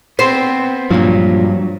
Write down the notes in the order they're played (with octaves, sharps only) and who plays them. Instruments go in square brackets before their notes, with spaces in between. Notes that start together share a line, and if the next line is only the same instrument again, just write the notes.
[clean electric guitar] B3 C4 [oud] C5
[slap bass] G2 [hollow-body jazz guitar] A#2 F3 [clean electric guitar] F#3